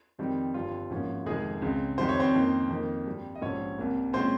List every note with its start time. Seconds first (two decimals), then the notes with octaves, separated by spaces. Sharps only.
0.19 F2 D#3 G3 C4
0.54 G1 G2 G3 C4 F4
0.90 G#1 G#2 F3 A#3 C#4
1.26 F1 F2 D#3 G#3 G#4
1.62 C#2 C#3 G#3 C4
1.98 F2 D#3 G3 C5
2.09 C#5
2.20 C4 C5
2.34 F2 D#3 A#3 C#4
2.69 F2 D#3 A#3
3.06 G2 G3 C4
3.35 D#5
3.42 A#1 G#2 G3 C#4 C#5
3.78 C2 C3 G3 A#3
4.13 A#2 G#3 C4 C#4 C5